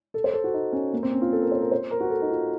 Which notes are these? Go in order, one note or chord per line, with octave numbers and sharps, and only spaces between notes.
A4
C5
A4
F#4
D#4
C#4
A#3
C4
C#4
F4
A4
A#4
C5
A#4
C5
A#4
F#4
A4
D#4
F4